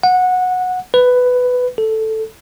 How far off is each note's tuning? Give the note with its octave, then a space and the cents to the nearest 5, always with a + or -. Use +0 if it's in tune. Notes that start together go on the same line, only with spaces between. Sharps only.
F#5 -15
B4 +10
A4 +0